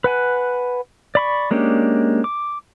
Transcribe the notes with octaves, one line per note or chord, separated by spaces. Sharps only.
B4 F#5 G#5
D5 B5 C#6
G#3 A#3 C#4 D4 G4
D6